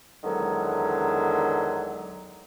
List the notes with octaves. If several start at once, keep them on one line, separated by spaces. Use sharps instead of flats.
E2 D3 D#3 F#3 G#3